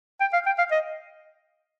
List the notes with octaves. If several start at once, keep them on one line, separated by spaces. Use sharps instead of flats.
G5
F5
G5
F5
D#5